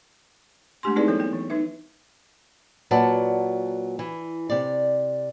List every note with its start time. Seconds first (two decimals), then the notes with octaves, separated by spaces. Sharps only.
0.83 G#3 A3 D4 G4 G#5 C6
0.96 C4 D#4 E4 G#4 B4 D5
1.07 E3 F#3 B3 A4 C5 C#5
1.20 B3 G5
1.33 E3
1.50 D#4 B4 E5
2.91 A#2 F#3 B4 D5 F#5 A5
3.99 E3
4.50 C3 D5